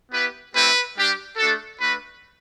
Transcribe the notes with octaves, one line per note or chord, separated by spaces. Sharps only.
B3 E4 G4 B4
A3 C4 E4 G4 B4
G3 D4 G4
A3 D4 F#4 A4
A3 D4 F#4 B4